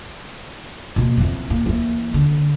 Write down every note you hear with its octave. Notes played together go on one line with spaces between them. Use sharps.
B2 A#3
F2 E3
A#2 A#3
E3 A#3
D3